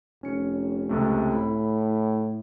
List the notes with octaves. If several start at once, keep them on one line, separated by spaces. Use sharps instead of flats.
F1 C#4 C#7
C#2 C3 A3
A2 B5